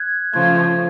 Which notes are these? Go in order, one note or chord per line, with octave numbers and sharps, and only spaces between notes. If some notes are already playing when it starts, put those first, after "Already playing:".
Already playing: F#6 G#6
C#3 F3 A3 F4 G#6